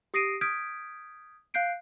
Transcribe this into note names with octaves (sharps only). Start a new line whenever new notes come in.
G4 D#6 A#6 C7 D7 D#7
D#6 F6 G6 G#6 B6 D7
F5 F#6 G6 C7 D7